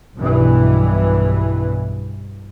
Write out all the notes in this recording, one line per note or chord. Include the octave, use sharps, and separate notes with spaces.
B1 G2 B2 E3